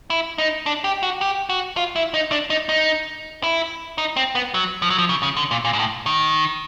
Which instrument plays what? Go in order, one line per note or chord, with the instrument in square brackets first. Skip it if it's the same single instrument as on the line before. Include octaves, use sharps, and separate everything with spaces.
[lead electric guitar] E4
D#4
D4
G4
F#4
G4
F#4
F4
E4
D#4
D4
D#4
D#4
E4
D#4
C4
B3
F#3
F3
F#3
F3
C#3
C#3
D3
A#2
A#2
G#2
A2
D#3